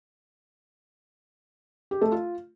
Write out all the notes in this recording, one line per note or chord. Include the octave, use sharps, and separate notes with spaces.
G4
A3
F4